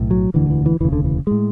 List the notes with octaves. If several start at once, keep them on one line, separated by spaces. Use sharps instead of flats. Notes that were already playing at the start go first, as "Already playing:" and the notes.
Already playing: B1 A2
F#3
E1 D2 D3 E3
E3
E3
E1 D2 C#3 E3
D3
E3
A2 G#3